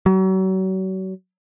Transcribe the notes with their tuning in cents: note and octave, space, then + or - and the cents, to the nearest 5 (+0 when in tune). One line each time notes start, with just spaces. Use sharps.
F#3 +35